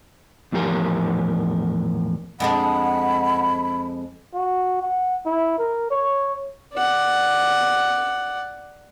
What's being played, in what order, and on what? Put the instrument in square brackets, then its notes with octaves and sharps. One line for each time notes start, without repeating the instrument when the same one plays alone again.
[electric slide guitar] E2 A2 F3 G4 A#4
[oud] F2 G#3 D4 [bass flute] F#5 [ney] B5
[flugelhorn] F#4
F#5
E4
A#4
C#5
[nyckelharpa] D5 F#5